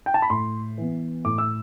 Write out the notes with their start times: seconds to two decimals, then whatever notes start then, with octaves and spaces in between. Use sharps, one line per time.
0.06 G5
0.14 A5
0.22 B5
0.30 A2 C6
0.78 E3 B3
1.25 A2 D6
1.38 E6